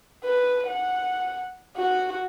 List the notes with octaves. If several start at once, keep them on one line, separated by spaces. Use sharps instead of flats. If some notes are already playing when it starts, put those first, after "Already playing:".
B4
F#5
F#4